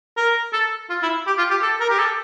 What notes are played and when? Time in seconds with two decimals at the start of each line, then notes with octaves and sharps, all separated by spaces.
0.17 A#4
0.53 A4
0.90 F4
1.03 E4
1.27 G4
1.38 F4
1.50 G4
1.63 A4
1.80 A#4
1.90 G4
1.99 A4